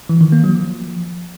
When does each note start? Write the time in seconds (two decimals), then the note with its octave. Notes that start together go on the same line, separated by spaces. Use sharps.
0.09 E3
0.21 D#3
0.32 A#3
0.44 F#3
0.55 F3